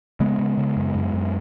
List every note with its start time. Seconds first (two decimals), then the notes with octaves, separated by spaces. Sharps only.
0.20 C#3 G#3 B3
0.39 C#3
0.58 C#3
0.77 F#2
0.95 F#2
1.13 F#2